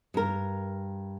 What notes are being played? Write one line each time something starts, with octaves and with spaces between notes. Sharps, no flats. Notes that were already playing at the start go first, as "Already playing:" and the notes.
G2 A#4